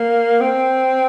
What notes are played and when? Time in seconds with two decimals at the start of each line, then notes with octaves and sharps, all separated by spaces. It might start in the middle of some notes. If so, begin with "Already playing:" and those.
Already playing: A#3
0.41 C4